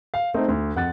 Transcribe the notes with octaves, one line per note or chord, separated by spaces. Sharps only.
F5
A3 C4 D#4
D2
F2 F#5 F#6 A6